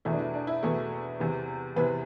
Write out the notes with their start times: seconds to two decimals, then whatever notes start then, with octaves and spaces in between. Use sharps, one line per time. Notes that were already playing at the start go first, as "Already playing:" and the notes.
0.05 E2 B2 A3 E4
0.13 D4
0.19 E4
0.34 D4
0.47 E4
0.63 E2 B2 A3
1.19 E2 C3 E3
1.76 E2 C3 E3 B3 B4